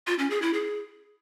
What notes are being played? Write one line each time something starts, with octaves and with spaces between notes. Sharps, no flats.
F4
C#4
G#4
E4
G#4